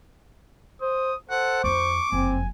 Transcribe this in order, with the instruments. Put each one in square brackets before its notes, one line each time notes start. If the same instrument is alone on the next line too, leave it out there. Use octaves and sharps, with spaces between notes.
[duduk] C5 [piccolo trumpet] D#6
[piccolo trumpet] A4 [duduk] C5 [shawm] F#5
[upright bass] F2 D#4 [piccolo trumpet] C#6 [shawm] D6
[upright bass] F#1 F2 [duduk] C4 [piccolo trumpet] G#5